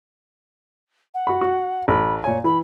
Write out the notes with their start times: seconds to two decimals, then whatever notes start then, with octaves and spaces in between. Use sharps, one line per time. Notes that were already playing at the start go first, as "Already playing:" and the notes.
1.14 F#5
1.27 F#4 B5
1.41 F#4
1.88 A1 B5
2.24 A#2 C#5 G#5
2.44 E3 B5